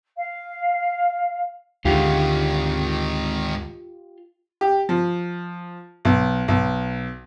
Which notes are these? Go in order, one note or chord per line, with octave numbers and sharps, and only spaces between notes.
F5
D2 G#2 D3 D#3 G#3 F4 G4
G4
F3
B1
B1